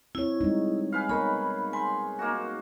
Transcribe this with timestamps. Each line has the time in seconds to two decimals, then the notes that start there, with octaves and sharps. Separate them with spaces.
0.15 C4 E4 C#5
0.41 G3 G#3 D#4
0.92 G#4 B4 F5
1.09 B3 D#4 A#4 C#5 B5
1.73 G#5 B5 C6
2.19 A#3 D#4 F#4